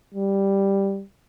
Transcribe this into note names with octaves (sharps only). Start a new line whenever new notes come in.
G3